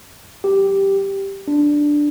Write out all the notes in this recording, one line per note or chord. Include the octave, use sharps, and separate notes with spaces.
G4
D4